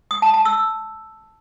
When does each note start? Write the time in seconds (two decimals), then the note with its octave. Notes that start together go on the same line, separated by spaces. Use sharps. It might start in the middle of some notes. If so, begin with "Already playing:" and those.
0.11 D#6
0.22 A5
0.34 A5
0.45 E6